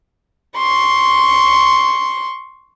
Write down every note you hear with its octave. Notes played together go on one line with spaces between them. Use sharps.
C6 C#6